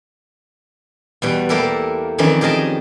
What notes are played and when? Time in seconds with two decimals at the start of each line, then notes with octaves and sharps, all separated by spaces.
1.22 E2 B2 G3
1.49 A#3 E4 G4 A4 A#4
2.18 F2 D#3 E3 C#4 D5
2.41 G4 G#4 A#4 D#5 A5